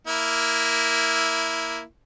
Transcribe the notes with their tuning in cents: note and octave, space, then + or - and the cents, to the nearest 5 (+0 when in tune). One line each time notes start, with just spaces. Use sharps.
A#3 +0 E4 +0